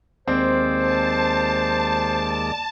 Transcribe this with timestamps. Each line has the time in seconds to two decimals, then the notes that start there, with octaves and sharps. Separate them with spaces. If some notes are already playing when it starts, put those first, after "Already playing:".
0.28 D#2 G#3 C4 C5 D5
0.76 A5